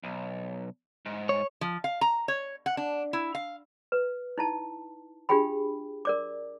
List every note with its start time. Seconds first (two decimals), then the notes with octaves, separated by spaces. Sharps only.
0.04 B1
1.06 G#2
1.29 C#5
1.61 F3
1.84 F5
2.01 A#5
2.28 C#5
2.66 F#5
2.77 D4
3.13 E4
3.35 F5
3.92 B4
4.38 D#4 E4 A5
5.29 D4 F4 G4 G#4 G5 B5
6.05 A#4 D5 D6